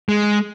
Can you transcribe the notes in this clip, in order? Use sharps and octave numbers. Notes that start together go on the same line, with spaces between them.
G#3